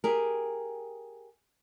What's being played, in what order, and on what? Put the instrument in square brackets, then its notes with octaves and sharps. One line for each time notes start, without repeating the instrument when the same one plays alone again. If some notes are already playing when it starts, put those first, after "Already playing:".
[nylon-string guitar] G4 G#4 A#4